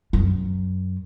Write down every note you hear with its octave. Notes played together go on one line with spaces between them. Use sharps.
F#2